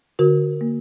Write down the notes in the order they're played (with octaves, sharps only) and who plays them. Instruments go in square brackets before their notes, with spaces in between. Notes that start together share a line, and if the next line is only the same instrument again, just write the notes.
[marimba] D3 F#4 A#4
A#3